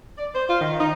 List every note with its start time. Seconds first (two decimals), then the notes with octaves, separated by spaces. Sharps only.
0.18 D5
0.34 C5
0.49 F4
0.61 D#3
0.80 D#4